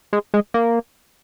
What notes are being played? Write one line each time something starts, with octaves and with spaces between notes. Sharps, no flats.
G#3
G#3
A#3